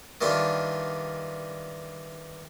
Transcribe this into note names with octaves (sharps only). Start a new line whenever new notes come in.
D#3 E3 G3 D4 F4